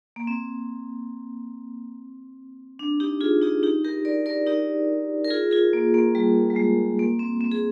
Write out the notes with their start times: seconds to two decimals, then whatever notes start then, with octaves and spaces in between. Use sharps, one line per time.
0.16 A#3
0.27 C4
2.79 D4
3.00 D#4 G4
3.21 F4 G#4
3.41 D#4 G4
3.63 D#4 G4
3.84 G4 A#4
4.05 A#4 D5
4.26 A#4 D5
4.46 D#4 G4
5.25 A#4
5.30 F4 G#4
5.51 F4 G#4
5.73 A#3
5.94 A#3
6.15 G3
6.50 G3
6.56 G#3
6.99 A#3
7.19 C4
7.41 C4
7.52 G#4